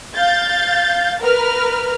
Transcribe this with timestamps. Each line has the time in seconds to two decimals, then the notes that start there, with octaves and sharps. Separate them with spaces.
0.14 F5 G6 A6
1.21 A#4 B4 F6